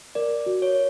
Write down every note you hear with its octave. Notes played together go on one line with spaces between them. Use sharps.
A#4 D5
F#4
C#5